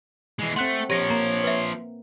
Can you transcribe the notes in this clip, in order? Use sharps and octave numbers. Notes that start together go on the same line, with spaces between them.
E3 G#3
A3 C4 F#5 C6 F#6
F3 G4 A#4 C#5 A#6 C#7
A#3 A#5
B4 E5